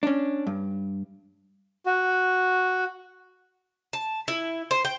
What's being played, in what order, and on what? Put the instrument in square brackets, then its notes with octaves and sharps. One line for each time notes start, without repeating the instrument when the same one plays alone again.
[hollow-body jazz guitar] C#4 D4
G2
[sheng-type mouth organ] F#4
[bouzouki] A5
E4
C5
G5